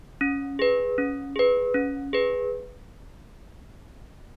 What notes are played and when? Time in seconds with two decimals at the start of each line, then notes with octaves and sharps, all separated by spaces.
0.21 C#4
0.59 G#4 B4
0.98 C#4
1.36 G#4 B4
1.74 C#4
2.13 G#4 B4